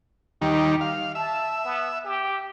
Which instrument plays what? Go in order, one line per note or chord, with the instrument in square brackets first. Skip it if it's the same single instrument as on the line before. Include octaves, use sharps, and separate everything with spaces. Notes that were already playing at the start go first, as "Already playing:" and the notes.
[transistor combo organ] D#2 D#3 G3 [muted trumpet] G4
[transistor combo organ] F5
[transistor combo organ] E5 [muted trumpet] A5
[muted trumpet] B3
G4